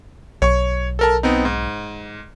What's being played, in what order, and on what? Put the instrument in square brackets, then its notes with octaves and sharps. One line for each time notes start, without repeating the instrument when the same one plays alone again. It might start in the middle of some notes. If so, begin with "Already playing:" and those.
[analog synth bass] B1 [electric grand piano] C#5 C#6
[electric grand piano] A4 A#4 A5
B3 C4 D#4
G#2